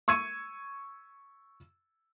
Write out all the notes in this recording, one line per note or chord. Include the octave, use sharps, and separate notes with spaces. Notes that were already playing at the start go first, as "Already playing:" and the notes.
C#6 E6 G#6 C#7 D#7